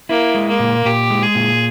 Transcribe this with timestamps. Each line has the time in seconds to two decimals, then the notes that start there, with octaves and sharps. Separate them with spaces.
0.09 A#3 E4
0.35 G#3
0.48 A#3
0.60 A#2
0.85 A#2 G4
1.10 G#3
1.22 G#4
1.35 A#2